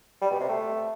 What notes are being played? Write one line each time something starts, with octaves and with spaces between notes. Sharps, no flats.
G3
B2
C3
A3